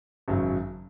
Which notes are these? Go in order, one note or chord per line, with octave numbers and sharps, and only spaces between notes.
G#1 F#2 C#3 F#3